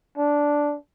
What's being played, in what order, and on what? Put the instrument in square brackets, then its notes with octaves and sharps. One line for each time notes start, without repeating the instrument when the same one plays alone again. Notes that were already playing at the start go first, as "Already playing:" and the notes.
[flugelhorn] D4